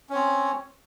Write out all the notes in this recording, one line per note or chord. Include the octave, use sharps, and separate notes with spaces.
C4 C#4 C#5